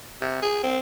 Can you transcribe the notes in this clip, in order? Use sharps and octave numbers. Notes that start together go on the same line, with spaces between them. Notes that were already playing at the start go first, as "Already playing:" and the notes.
C3
G#4
C4